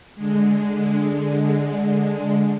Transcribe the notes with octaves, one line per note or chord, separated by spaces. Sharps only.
D3 G#3